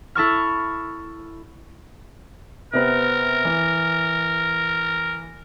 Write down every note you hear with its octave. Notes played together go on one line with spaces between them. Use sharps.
E4 A4 C#6 F6
C3 B3 C4 A#4
E3